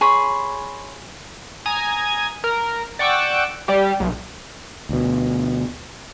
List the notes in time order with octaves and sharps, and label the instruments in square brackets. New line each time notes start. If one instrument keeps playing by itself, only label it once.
[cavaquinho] G#4 C#5 B5 C6
[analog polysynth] G#5 A#5 D#6 G#6
A#4
D5 F#5 G5 C#6 D6 E6
G3 G4
B1
[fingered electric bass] D2 B2